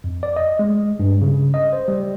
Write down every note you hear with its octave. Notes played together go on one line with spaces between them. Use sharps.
F2
D5
D#5
G#3
G2
C#3
D#5
C5
G3